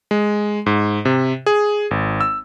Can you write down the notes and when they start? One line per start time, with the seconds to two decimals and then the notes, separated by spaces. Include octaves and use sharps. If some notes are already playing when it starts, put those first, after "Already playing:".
0.11 G#3
0.66 G#2
1.05 C3
1.46 G#4
1.91 G#1
2.21 E6